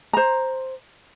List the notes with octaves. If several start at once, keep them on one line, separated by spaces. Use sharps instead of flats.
C5 A#5